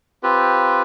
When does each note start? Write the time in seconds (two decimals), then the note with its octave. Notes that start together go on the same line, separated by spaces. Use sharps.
0.23 C4 F4 G4 B4